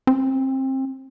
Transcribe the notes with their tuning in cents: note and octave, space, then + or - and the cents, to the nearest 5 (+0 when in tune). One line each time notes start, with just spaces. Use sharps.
C4 +25